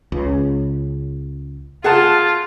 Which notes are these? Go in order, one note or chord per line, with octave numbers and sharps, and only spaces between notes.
C#2 C#3
F4 G#4 F#5 A5